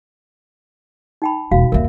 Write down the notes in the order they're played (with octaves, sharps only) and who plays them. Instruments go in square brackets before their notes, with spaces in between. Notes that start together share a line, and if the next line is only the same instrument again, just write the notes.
[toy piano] D#4 G5 B5
[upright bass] E1 [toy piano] F#4 F5
[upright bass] G1 D#2 [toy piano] A#4 C#5 E5